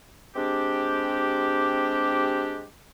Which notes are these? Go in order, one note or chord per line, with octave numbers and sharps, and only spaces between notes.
G#3 C4 D4 G4